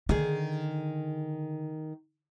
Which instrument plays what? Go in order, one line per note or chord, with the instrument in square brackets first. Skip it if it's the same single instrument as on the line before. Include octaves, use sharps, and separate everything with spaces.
[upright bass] D3 [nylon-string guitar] D#3 G#4